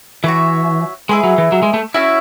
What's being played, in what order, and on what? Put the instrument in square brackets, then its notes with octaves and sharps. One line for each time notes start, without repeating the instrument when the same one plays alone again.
[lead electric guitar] E3 [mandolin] F#4 C#5 E5
[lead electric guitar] G#3 [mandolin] E4 G#4 B4
[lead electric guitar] F#3
E3
F#3
G#3
A3
[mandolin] C#4 F#4 C#5 E5 [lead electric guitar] E4